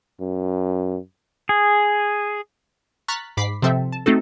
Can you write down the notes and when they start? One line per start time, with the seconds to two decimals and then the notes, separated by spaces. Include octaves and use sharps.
0.21 F#2
1.49 G#4
3.08 A#5 C#6 F6 F#6 A6 B6
3.37 G#2 B5 D6 B6 C7
3.62 C3 F3 C4 A4 E5
3.92 A5
4.06 A3 C4 D#4 F#4 A4